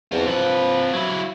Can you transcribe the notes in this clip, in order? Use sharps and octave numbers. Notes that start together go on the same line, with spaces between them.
E2 C4 F4
C3 F3 B4
F#3 E4